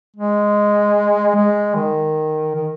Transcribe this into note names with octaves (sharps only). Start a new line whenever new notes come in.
G#3
G#3
D#3
D#3